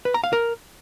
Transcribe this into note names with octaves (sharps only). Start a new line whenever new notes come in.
B4
A#5
F5
A#4